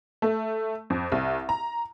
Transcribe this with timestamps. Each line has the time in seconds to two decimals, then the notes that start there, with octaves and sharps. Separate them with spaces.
0.22 A3
0.90 F2
1.12 C2
1.49 A#5